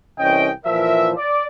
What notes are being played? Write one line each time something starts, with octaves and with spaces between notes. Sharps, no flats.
C2 E3 C#4 D#5 G5
A#2 E3 F3 A#4 E5
D5